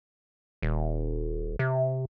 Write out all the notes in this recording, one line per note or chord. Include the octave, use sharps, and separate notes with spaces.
D#1
C3